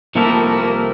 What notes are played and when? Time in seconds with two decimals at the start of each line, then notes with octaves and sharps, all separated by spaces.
0.15 C2 C3 F3 A3 A#3 E4
0.45 A#3